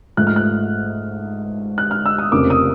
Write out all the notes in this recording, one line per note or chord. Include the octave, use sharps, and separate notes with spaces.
G#2 F3 A3 F#6
F6
F#6
F#6
F6
E6
D#6
F1 F2 C#3 F3 A#3 D6
D#6